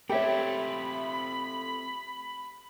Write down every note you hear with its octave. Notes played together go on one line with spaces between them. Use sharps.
A3 C4 G4 A4 C#5 E5 B5